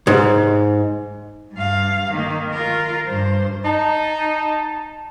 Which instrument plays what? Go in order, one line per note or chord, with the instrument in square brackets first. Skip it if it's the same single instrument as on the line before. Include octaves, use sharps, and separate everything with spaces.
[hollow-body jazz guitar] G#2
[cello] G2 F5
D#3 A#3
F4 A#4
G2 C5
[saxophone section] D#4 [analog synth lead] A5